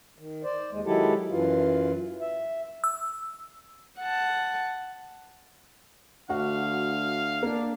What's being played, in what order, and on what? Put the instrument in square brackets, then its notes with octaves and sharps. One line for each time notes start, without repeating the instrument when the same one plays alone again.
[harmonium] D#3
C5 D5
D#2 G#3
D#3 F#3 G#3 E4 G4 A4
F#2 E3 F4
E5
[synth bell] E6
[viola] F#5 A5
[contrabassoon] D2 [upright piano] F#4 [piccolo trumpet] F5
[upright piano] A#3 [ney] D4